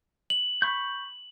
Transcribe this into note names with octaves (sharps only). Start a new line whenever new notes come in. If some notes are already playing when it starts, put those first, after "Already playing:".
F#7
B5 C#6 G6